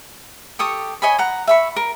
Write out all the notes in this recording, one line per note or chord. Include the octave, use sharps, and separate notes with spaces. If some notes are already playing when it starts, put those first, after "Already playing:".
G4 A4 C#6 D#6
C#5 D#5 G#5 B5
F#5 A#5
E5 B5 C#6
A#4